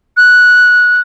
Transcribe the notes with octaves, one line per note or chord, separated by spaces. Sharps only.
F#6